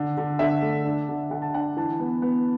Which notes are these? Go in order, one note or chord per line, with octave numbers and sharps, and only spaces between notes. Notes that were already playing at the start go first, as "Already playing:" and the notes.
Already playing: D3
D3
D3 E5
A3
D4
D3
D3 F#5
A5
D4 F#5
E3 A5
B3
B3